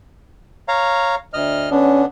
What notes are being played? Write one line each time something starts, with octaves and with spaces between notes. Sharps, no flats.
C#5 F5 A#5
D2 D#5 F6
D3 B3 C#4 D4